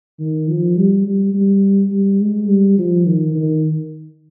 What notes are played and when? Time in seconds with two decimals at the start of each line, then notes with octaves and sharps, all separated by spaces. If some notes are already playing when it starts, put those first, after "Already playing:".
0.19 D#3
0.48 F3
0.77 G3
1.06 G3
1.34 G3
1.92 G3
2.20 G#3
2.49 G3
2.78 F3
3.06 D#3
3.35 D#3